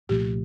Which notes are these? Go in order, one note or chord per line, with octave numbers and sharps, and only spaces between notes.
C2 A#2 F3 A3 G4